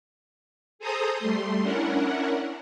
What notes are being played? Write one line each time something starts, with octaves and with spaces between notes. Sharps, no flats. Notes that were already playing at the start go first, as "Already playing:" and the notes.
G#4 A4 C5 A#5 D#6
G3 A3 C6
C#4 D4 E4 A#4 F#5